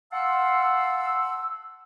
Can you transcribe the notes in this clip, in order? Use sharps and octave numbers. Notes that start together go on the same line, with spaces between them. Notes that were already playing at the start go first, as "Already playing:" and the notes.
F5 F#5 A5 C6 E6